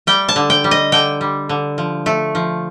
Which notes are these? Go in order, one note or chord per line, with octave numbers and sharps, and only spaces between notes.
G3 G5
A5
D3
G5
G3
D#5
D3 G5
G3
D3
F3
A3
F3